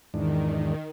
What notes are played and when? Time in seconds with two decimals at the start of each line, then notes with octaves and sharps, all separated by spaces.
0.14 E2 G#2 D#3 D4